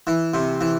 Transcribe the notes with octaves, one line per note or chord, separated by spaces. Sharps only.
E3
C3
E3